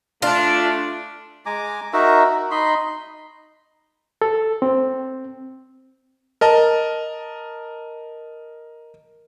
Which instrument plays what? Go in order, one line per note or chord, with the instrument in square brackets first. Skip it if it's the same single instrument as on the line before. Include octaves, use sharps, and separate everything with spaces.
[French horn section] A3 D4 [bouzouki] F4
[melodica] G#3 G#5 A#5 D6
D#4 F#4 A#4 E5
F#4
D#4 D#5 B5 C6
[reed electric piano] A4
C4
[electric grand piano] A#4 D#5 A5